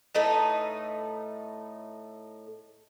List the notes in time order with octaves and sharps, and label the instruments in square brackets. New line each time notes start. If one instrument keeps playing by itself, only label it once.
[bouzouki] A2 A3 D#4 B4